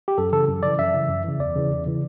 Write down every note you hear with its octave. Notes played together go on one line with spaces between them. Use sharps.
G4
F#2 A4
C#3 E3 A4
F#2
C#3 E3 D5
F#2 E5
C#3 E3
F#2
C#3 E3
E2 D5
C#3 E3
E2
C#3 E3